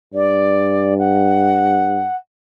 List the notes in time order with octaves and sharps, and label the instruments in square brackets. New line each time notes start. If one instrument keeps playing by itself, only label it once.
[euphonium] G2 [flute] D5
[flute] F#5